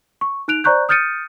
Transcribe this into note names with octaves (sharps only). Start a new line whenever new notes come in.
C#6
D#4 F#6 D7 F7
C5 D5 A#5 C#6 F#6 G6
D#6 F6 G6 A6 C#7 D#7